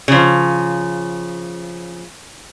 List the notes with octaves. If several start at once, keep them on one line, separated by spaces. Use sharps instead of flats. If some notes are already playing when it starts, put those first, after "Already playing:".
C#3 F3